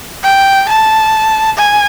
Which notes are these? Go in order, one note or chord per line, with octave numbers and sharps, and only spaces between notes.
G5
A5
G#5